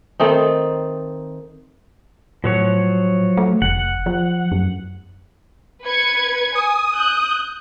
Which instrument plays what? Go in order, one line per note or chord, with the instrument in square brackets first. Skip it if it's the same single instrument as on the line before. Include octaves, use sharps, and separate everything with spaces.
[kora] D#3 A3 C4 D#4
[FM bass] A2 [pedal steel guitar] F3 F#3 C#5
[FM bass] A3
[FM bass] F1 [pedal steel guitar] F#5
[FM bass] F3
F#2
[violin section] B4 G#6 C#7
[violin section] G#5 [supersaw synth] D#6
[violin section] F#6 G6